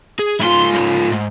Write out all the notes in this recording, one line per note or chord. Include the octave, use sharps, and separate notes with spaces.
G#4
G#2 E4 F4 C6
B1 C#3
G#2